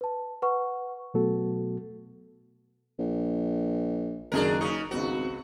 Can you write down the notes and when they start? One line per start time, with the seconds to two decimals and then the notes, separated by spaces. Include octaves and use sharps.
0.01 B4 A5
0.42 B4 F#5 C#6
1.14 B2 F#3 A3 B3 F#4 A4
2.99 A#1
4.32 F#1 C#2 F#2 D#3 D4 G#4 A#4
4.61 C#3 D#4 C#6 D#6
4.91 G#1 C#2 B3 C4 F#4